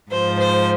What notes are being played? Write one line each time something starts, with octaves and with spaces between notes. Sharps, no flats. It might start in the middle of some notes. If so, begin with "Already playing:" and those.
G#2 F3 C5
C5